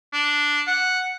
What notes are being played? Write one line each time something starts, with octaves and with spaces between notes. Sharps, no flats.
D4
F#5